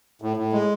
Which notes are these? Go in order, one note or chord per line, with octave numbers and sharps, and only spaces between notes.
A2
A2
G#3